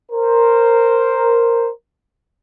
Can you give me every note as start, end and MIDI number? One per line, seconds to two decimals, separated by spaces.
0.12 1.69 70
0.12 1.69 72